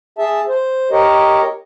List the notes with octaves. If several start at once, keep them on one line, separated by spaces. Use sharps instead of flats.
G#4 E5 A5
C5
G4 A#4 C#5 D#5